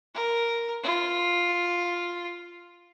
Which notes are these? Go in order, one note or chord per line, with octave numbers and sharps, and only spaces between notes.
A#4
F4